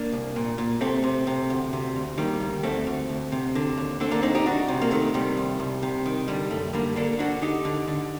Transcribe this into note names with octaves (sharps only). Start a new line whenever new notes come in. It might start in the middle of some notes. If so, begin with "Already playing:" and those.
Already playing: A#3 D4
C2
A#2
A#2
C3 A3 C4
C3
C3
D2
C3
D2
D#3 G3 A#3
D2
D2 A3 C4
D2
D2
C3
D3
D#2
D3 A3 C4
A#3 D4
D#2 C4 D#4
D#4 G4
C2 D4 F#4
C3
A#3
D#3 A3
C3 G3
C2
C2
C3
D#3
D3 G3
F#2 A3
D3 G3 A#3
D3 A#3 D4
D3 D4 F#4
D3 D#4 G4
D3
D3